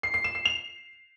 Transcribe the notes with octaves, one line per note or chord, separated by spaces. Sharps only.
C7
C7
E7
C7
F7